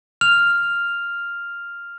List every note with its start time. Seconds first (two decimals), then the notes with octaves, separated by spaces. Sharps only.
0.21 F6 F7